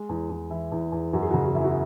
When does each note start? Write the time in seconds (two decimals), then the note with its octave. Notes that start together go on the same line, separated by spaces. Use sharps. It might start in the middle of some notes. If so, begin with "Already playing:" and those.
Already playing: G#3
0.09 E2
0.30 E2
0.50 E3 E4
0.72 E2
0.92 E2
1.13 F#2 F#4
1.22 G#4
1.31 F#4
1.34 C#3
1.44 F#4
1.55 F#2 E4
1.65 F#4